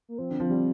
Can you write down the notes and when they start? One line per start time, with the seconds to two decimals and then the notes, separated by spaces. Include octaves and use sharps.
0.08 A#3
0.18 F3 C4
0.30 D3
0.40 F3
0.50 G3